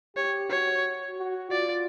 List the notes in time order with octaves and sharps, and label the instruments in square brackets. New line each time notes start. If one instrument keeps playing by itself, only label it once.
[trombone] G4 [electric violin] C#5
[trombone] F#4 [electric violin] C#5
[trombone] F#4
[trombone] F4 [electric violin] D5